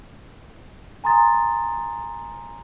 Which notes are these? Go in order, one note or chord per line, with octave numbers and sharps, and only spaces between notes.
G#5 A#5 C6 D#6 A6